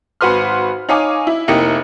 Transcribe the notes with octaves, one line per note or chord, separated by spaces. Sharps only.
G#1 F#4 B4 C6 F6
D#4 C#5 F5 G#5 D6
E4
F1 A#3 D#4 E4 G4 C#7